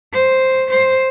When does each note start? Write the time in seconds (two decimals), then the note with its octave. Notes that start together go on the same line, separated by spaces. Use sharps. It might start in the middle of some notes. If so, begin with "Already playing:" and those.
0.13 C5
0.71 C5